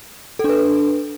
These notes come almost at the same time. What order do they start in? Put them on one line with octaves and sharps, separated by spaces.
A4 D4 B4